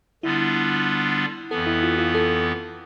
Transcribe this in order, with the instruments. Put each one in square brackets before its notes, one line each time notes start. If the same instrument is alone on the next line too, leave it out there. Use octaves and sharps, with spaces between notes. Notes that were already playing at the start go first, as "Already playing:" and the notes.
[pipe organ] D3 G3 B3 D4 F4 [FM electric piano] E4
[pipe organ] F2 E3 B3 [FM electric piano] A4
[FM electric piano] E4
F4
F4
A4